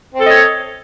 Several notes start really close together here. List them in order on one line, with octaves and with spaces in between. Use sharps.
C4 A4 D#5 C#5